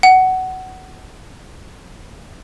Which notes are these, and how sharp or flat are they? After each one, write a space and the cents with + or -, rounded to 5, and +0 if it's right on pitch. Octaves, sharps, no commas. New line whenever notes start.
F#5 +15